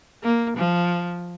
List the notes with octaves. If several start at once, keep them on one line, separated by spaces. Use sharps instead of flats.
A#3
F3